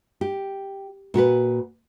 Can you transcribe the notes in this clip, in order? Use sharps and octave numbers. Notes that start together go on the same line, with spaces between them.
G4
A#2 F#4 A#4 B4